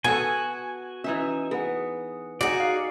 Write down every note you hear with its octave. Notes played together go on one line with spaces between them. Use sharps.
B3 F#4 G#4 A4 G#5
E3 C#4 D#4 B4 E5
B3 G#4 B4 F#5
D#4 F#4 G#4 D5
F5 F#5